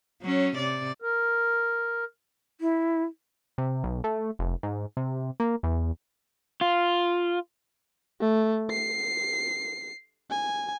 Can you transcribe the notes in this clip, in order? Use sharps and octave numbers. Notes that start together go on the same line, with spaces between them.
F#3 C#4
C3 D5
A#4
E4
C3
B1
A3
F1
G#2
C3
A#3
E2
F4
A3
C7
G#5